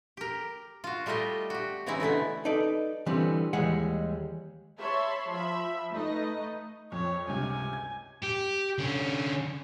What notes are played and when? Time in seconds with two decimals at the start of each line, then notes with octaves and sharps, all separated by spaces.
0.17 G4 A#4
0.84 F4 F#4
1.06 G3 A3 F4 G4 D#5 G5
1.50 F#4 G4
1.86 C#3 E3 G#3 C4 D#4 E4
2.00 B2 D3 A3 B3
2.45 D#4 A4 B4 D5
3.06 D3 E3 G3 B3 C4
3.53 D#2 E3 G3 G#3 G#4 F#5
4.80 C#5 E5 A5 B5 C6
5.30 F3 E5 B5
5.93 A3 D#4 B4 D#5
6.92 F2 C#5
7.27 C#2 G2 C3 G#5
7.73 G#6
8.24 G4
8.78 D3 C#4